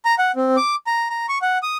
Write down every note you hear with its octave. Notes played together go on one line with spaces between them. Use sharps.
A#5
F#5
C4
D6
A#5
A#5
C#6
F#5
D#6